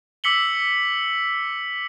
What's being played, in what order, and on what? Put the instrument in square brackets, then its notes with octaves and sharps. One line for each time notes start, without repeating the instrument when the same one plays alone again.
[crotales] D6 E6 B6 C#7 F#7 G7